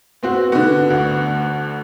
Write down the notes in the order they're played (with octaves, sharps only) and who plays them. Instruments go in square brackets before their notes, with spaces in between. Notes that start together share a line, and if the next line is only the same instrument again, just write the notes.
[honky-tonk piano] B3 C4 F#4
[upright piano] D3 F#4 [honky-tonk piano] B3
[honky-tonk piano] D2